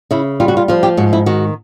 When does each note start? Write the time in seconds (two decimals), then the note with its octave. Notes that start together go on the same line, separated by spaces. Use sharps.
0.11 C#3 E4
0.40 G3 F4
0.48 F#4
0.57 F4
0.68 F3 F4
0.83 G4
0.97 G#2 F#4
1.13 E4
1.26 D#3 F#4